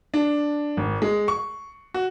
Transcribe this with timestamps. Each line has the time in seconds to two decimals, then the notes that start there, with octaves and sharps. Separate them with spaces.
0.14 D4
0.77 G#1
1.02 G#3
1.28 C#6
1.94 F#4